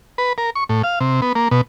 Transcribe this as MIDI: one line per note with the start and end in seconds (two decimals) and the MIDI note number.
0.18 0.33 71
0.38 0.50 70
0.55 0.64 85
0.69 0.82 45
0.83 0.99 77
1.00 1.21 48
1.22 1.33 59
1.35 1.48 58
1.51 1.61 47